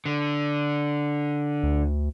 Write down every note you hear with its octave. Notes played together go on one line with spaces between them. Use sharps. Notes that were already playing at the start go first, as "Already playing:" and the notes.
D3
D2